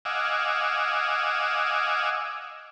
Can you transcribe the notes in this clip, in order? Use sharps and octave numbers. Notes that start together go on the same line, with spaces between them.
D#5 F5 F#5 G#5 D6 E6